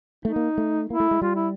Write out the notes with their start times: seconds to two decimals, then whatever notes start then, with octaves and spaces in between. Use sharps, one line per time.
0.25 A3 D#4
0.36 A#3
0.58 A3
0.90 A#3 E4
1.00 A3
1.11 G#3
1.22 G3 F4
1.35 E4